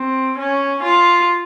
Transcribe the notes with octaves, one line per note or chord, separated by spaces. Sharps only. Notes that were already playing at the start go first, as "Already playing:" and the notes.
Already playing: C4
C#4
F4